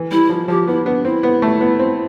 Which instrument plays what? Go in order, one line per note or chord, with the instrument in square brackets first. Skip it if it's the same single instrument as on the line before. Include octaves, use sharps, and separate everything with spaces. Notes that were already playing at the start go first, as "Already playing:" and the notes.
Already playing: [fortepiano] E3
[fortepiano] G3 [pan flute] E4
[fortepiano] F3
[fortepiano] F3 [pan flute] G4
[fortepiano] B3 [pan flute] E4
[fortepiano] B3 [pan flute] D4
[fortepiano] C4 [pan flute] E4
[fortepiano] B3
A3
B3
C4